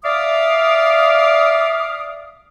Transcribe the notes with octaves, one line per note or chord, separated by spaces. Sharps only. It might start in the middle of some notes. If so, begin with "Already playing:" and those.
D5 E5 F5 D6 D#6